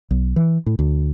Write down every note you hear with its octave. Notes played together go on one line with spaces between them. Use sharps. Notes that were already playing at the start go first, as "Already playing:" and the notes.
B1
E3
A2
D2